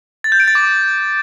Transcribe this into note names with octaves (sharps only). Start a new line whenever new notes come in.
A6
G6
D7
A6
D6